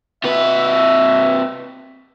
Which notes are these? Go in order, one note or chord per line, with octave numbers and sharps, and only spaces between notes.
C3 B4 E5